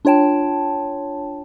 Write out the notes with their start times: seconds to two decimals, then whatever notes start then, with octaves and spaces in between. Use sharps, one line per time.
0.05 D4 F4 C#5 G5 A5